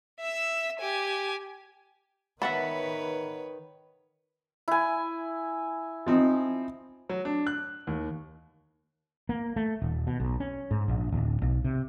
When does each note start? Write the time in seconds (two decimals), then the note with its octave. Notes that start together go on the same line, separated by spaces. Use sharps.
0.21 E5 E6
0.79 G4 G#5
2.42 D#3 B3 B4 C#5 E5 F#5 A5 B5
4.68 E4 G#5
6.07 F3 C4 D#4
7.09 F#3
7.25 D4
7.47 F#6
7.87 D#2
9.29 A#3
9.56 A3
9.82 D#1
10.07 B2
10.20 B1
10.40 C#4
10.71 G#2
10.88 A#1
11.12 D1
11.42 B1
11.64 C3